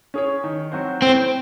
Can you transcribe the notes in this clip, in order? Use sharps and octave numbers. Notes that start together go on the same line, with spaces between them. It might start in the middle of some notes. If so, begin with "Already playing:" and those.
C#4 G#4 C#5
D#3
F#3 C4 F#4 C5
A2 C4